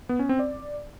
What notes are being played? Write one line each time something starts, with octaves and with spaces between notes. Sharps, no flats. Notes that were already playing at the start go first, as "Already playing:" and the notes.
B3
C#4
C4
D5